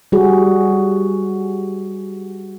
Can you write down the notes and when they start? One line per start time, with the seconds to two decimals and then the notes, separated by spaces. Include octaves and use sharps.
0.12 G3 F#4 G#4